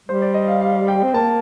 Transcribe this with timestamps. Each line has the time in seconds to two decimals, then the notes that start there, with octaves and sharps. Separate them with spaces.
0.08 G3 C5
0.22 D5
0.34 D#5
0.47 F5
0.61 F5
0.88 G5
1.04 C4
1.14 A#3 A5